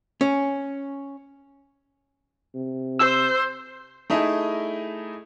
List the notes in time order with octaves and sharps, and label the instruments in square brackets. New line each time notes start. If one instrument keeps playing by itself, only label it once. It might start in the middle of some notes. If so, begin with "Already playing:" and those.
[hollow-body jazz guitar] C#4
[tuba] C3
[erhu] C5 [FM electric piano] E6
[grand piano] A3 D#4 E4 G#4 D#5